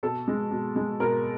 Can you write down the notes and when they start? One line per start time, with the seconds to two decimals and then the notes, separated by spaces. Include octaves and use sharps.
0.03 B2 A4
0.28 G#3
0.51 B2
0.76 G#3
1.00 B2 A#4